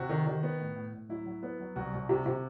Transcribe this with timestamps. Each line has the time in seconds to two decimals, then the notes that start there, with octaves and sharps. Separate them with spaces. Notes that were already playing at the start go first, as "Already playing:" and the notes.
Already playing: C3 F#4
0.09 D#3
0.27 D#3
0.43 B3
0.59 A2
0.76 A2
0.93 A2
1.09 F#3 E4
1.26 F#3
1.43 B3
1.60 F#3
1.76 C2 F#4
1.93 C2
2.09 C3
2.26 C3